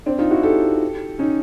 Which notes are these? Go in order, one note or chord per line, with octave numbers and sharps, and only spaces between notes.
C4 D4
D#4 F4
E4 F#4
G4 A4
C#4 D#4